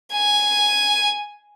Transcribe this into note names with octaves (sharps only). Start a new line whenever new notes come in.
G#5